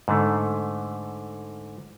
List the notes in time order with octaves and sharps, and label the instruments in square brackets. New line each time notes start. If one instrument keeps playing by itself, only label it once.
[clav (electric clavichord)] G#2 D3 A3